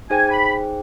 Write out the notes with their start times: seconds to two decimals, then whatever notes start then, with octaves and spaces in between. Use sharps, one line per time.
0.10 D#4 G#4 C5 G5 G#5
0.31 B5